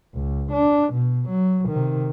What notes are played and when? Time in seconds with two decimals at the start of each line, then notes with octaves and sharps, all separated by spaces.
0.14 C#2
0.52 D4
0.93 B2
1.29 F#3
1.69 C3 D#3